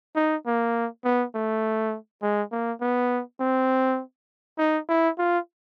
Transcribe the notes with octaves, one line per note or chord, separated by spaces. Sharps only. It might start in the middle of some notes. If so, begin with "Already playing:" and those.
D#4
A#3
B3
A3
G#3
A#3
B3
C4
D#4
E4
F4